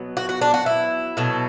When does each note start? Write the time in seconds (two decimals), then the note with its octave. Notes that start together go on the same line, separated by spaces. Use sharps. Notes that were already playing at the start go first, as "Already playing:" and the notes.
Already playing: B2 F#3 B3
0.17 F#4
0.29 F#4
0.42 D4
0.54 F#4
0.66 E4
1.17 B2 F#3 A3